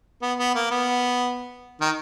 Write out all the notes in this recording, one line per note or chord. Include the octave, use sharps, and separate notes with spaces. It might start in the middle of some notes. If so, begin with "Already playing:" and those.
B3
B3
A#3
B3
D#3